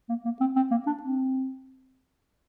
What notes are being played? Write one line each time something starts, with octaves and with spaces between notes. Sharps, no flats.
A#3
A#3
C4
C4
A#3
D4
C4